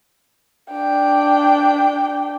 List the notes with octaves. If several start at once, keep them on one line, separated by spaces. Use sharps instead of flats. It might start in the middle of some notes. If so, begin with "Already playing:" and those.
D4 G5